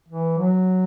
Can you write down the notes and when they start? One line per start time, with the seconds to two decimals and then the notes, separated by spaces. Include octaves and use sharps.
0.08 E3
0.38 F#3